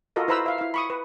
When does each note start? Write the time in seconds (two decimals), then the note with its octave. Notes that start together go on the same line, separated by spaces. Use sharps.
0.16 F4 F#4 A4 A#4 D#5
0.28 E4 B4 C5 A#5 B5 E6
0.46 E5 F5
0.58 E4 F5
0.74 B5 C#6 D#6
0.90 B4